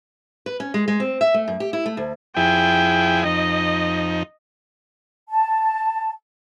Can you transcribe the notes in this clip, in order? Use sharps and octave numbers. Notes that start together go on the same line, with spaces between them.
B4
C#4
G#3
G#3
C4
E5
A3
F#2
G4
E4
A3
D2
F2 E4 G#4 G5
F2 D#4 D#5
A5